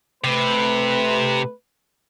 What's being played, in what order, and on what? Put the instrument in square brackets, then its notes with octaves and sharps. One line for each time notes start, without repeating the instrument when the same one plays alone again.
[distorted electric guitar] C3 [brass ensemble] A3 B4